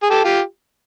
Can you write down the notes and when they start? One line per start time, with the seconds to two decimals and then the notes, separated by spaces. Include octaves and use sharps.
0.03 G#4
0.10 G4 A4
0.24 F4 G4